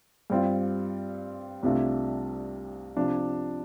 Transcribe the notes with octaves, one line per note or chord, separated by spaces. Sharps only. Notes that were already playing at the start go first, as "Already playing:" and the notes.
G2 G3 C4 F4
C2 C3 A3 D4 F4
C3 F3 D4 F4